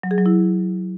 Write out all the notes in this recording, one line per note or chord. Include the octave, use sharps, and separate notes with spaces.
F#3
G#4
F#3
E4